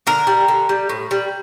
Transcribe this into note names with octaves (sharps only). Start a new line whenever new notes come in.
D3 A#4
G3
D3
G3
A2
G3